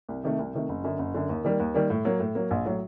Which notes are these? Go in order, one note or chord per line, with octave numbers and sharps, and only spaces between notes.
C2
C3 D#3 A3
C2
C3 D#3 A3
F#1
F#2 D3
F#1
F#2 D3
D#2
D#3 G3 A#3
D#2
D#3 G3 A#3
A2
F#3 A#3
A2
F#3 A#3
A#1
A2 F#3